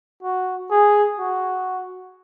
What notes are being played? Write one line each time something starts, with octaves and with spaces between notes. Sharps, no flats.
F#4
G#4
F#4